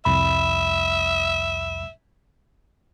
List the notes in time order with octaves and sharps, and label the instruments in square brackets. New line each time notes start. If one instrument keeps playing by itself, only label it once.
[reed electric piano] C2 F2 B5 [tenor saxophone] E5